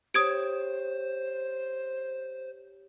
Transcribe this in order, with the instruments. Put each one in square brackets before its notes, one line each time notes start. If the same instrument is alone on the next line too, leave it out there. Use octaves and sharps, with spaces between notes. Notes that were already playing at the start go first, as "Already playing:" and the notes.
[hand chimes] G4 C#5 [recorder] C5 [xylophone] D#6 G#6 D7